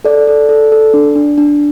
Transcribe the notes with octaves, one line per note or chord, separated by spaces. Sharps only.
A4 D5
A4
A4
A4
D4
D4
D4